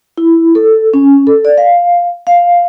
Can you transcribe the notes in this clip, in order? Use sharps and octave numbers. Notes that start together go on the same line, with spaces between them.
E4
A4
C#4
A4
D5
F5
F5